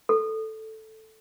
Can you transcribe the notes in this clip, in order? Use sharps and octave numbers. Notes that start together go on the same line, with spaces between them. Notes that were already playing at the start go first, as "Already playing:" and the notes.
A4